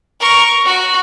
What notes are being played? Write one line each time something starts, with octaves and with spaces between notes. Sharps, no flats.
A#4 C#6
F#4